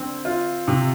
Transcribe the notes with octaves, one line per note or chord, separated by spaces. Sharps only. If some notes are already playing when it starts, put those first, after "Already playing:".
Already playing: D3 C4
F4
C3